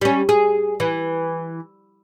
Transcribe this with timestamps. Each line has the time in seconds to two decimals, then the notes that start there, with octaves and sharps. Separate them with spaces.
0.01 G3 C#4
0.29 G#4
0.80 E3